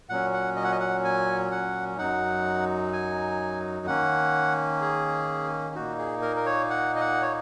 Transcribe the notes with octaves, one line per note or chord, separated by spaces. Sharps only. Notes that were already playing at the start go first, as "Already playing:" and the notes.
A#2 F#3 C#4 F#5
F#5
D#5
F#5
D#5
F#5
G#5
F#5
F#2 F#3 D#4 F#5
G#5
D#3 A#3 C#4 F#5
G#4
A#2 A#3 D#4 F#4
G#4
A#4
A#4
C#5
F#5
D#5
F#5
C#5